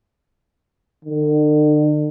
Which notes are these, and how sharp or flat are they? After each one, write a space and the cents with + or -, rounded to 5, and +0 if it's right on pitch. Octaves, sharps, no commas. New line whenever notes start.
D3 +45